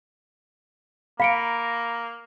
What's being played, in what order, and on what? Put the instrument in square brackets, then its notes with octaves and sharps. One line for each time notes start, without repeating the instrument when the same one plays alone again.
[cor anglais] A#3 [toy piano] F5 [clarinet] A#5 [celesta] B5 C#7 D7